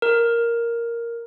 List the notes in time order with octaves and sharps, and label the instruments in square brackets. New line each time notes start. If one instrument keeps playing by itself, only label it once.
[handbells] A#4